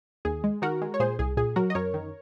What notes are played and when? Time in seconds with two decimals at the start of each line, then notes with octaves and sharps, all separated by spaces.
0.25 D#2 G#4
0.44 G#3
0.62 D#3 F#4 A#4
0.82 G#3
0.94 C#5
1.00 A#2 G#4 C5
1.19 C2 G#4
1.37 A#2 G#4
1.56 F#3 F#4 A#4
1.70 D#5
1.75 F#2 A#4 C#5
1.94 D#3